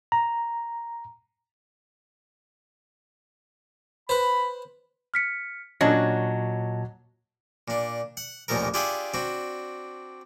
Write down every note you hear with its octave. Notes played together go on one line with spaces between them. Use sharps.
A#5
B4 C5 B5
F6 B6 C#7
A#2 F#3 C#4 D4 D#5 A5 A#6
A#2 D4
F#5
A1 D#2 A#2 F3 A4 A#4
D4 F4 G4 G#4 E5 F#5
C4 D4 F#4